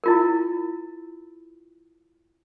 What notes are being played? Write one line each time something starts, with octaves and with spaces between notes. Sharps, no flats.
E4 F4 A#4